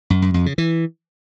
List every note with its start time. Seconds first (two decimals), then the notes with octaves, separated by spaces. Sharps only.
0.10 F#2
0.22 F#2
0.34 F2
0.46 C#3
0.58 E3